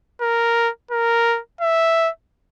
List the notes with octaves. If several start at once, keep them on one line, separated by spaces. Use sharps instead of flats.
A#4
A#4
E5